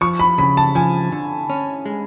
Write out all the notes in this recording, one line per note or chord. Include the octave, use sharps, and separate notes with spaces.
F3 C#6
B5
C#3 B5
A5
F3 G#5
D3
C#4
G#3